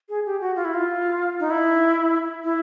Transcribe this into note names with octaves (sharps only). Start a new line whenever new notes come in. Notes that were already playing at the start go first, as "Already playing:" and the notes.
G#4
G4
F#4
F4
E4
F4
D#4
E4
E4